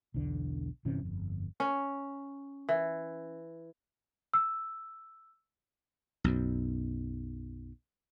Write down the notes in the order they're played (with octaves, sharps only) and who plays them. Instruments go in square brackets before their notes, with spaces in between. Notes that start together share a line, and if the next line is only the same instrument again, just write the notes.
[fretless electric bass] B1 E2 D3
G1 C3 E3 C#4
G1 F2
[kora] C#4
E3
[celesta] E6
[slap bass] B1 F#2